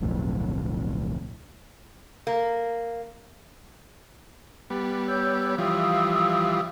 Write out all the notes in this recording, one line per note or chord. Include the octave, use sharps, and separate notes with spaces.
D1 B1 F2 A2
A#3
G3 B3
C#5 E6 G6
E3 F3 G3 F5 D#6 E6